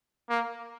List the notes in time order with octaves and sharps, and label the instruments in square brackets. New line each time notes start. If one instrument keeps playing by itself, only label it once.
[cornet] A#3